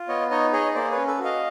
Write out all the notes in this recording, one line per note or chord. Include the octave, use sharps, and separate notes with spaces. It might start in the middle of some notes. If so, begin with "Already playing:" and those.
Already playing: F4
B3 C#5 D#5
D#4 C#5 D#5
G#4 C#5 D#5
A#3 C5 D5
B4 C#5
C#4
A4 B4
F#4
D#5 F5